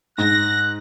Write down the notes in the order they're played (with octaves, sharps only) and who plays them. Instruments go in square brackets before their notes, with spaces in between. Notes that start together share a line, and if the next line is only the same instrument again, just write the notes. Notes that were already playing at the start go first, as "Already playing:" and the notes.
[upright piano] G#2 [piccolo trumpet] F#6 [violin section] A#6